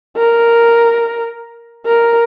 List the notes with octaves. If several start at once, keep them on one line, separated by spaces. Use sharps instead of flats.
A#4
A#4